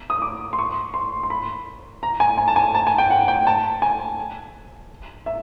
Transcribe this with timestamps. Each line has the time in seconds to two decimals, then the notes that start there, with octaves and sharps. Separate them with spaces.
0.10 D#6
0.22 D6
0.53 C6
0.59 C#6
0.94 C6
1.23 C6
1.30 B5
2.03 A#5
2.20 G#5
2.38 G#5
2.48 A5
2.56 G#5
2.75 A5
2.87 G#5
2.98 G5
3.10 F#5
3.28 G5
3.47 A5
3.82 G#5
5.26 E5